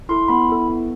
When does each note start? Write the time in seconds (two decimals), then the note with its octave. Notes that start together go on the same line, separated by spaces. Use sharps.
0.09 E4 A4 C6
0.28 B3 B5
0.49 E4 A4
0.69 B3